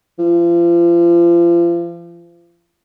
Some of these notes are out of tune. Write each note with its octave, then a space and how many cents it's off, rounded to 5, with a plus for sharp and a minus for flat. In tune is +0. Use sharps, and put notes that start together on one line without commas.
F3 -35